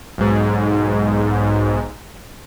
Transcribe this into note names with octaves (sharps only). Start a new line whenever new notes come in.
B1 G#2